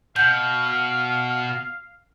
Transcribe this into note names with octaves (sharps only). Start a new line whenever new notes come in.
B2 F5 G6